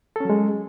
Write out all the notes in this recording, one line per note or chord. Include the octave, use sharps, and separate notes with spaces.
F#3 G#3 C#4 A4